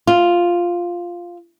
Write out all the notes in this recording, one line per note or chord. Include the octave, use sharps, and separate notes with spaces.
F4